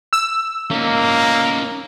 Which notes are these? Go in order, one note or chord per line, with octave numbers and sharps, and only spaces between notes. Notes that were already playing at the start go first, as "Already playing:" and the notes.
E6
A#3 C#4 D#4